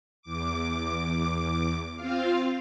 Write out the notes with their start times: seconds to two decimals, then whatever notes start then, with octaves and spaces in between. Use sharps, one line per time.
0.22 E2 D6
1.96 C4 F4 F5